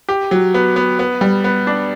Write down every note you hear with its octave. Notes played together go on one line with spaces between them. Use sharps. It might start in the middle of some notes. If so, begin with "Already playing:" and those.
G4
F#3
B3
B3
B3
G3
B3
D4